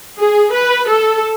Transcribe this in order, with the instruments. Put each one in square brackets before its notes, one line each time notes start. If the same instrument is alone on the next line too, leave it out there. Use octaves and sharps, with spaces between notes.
[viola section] G#4
B4
A4